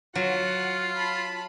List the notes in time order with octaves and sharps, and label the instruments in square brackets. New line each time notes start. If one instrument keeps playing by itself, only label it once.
[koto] F#3 [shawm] F4 [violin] F#5
[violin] A5 B5